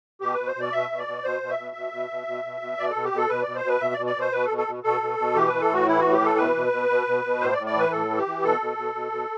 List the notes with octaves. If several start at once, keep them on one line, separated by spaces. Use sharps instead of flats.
B2 G4
B2 B4
C5
B2 D5
B2 E5
B2
D5
B2
B2 C5
B2
E5
B2
B2
B2
B2
B2
B2
B2
B2 D5
B2 A4
G4
B2 A4
B2 B4
B2 D5
C5
B2 B4
B2 E5
D5
B2
D5
B2 C5
B2 B4
A4
B2
A4
B2
B2 A4
B2
B2
E3 G4
E3 B4
A4
A2 F#4
E3 E4
A2 F#4
G4
E3 A4
B2 B4
B2
B2
B2
B2
B2
A2 C5
D5
A2
D5
E3 B4
A2 A4
E3
G4
E3
B2 A4
B2
B2
B2
B2